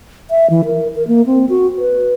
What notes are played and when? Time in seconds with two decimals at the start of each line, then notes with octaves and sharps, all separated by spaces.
0.30 E5
0.50 E3
0.65 A#4
0.95 A#4
1.08 A#3
1.26 C4
1.49 F#4
1.78 B4